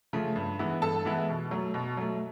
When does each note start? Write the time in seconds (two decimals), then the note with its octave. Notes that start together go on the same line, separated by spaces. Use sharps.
0.13 C#3 F3 A3
0.36 G2
0.59 E3 G#3 B3 E4
0.82 G2 A4 A5
1.05 E3 G#3 B3 E4
1.29 B2
1.51 F#3 A3
1.74 B2
1.97 F#3 A3